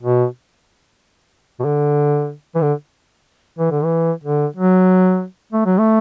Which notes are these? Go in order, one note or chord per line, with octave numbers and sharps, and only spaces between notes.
B2
B2
D3
E3
D3
E3
D3
E3
D3
F#3
A3
F#3
A3